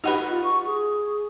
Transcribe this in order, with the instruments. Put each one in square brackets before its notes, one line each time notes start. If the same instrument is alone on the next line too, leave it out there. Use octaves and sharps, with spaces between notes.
[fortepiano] D#4 F#4 B4 [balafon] G4 F#5 B5
[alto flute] F4
C#6
G#4